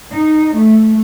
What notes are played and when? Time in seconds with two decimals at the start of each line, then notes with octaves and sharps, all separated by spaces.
0.11 D#4
0.56 A3